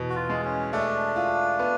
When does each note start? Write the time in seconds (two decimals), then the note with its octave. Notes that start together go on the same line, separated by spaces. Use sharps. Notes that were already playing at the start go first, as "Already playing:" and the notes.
Already playing: E2 B2
0.10 F#4
0.15 F4
0.29 G#3
0.44 C#4
0.73 A3 D4
1.16 F4
1.59 B3